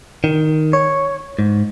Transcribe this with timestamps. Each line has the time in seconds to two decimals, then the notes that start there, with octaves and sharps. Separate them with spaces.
0.24 D#3
0.73 C#5
1.39 G#2